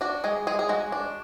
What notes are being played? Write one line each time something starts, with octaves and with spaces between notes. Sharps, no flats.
D4 F#4
G#3 G#4
G#3 G#4
G#4
G#3 F#4
D4